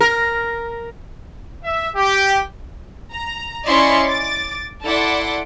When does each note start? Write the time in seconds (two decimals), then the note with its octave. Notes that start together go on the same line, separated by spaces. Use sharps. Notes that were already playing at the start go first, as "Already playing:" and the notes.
0.01 A#4
1.64 E5
1.95 G4
3.12 A#5
3.67 C#4 E4 D5 D#5 C6 C#6
4.07 D6 A6
4.84 E4 A4 D5 F#5 C6 D6